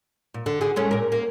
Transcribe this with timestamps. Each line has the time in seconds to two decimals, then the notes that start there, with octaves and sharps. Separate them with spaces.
0.34 A#2
0.46 D3
0.61 D3 G#4
0.76 G#3 A3 C#4
0.91 A#2 A#4
1.12 A#3